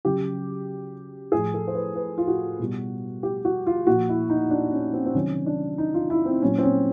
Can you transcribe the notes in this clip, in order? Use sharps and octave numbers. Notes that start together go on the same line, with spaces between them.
C#3 F#3 G4
A2 F3 G#4
A4
C5
B4
B4
F4
F#4
B2 G3
G4
F#4
F4
A#2 F3 F#4
E4
D#4
D4
C#4
C4
C4
C3 D#3 F#3 C#4
D4
D#4
F4
E4
C4
A#2 F#3 C#4
C4
C#4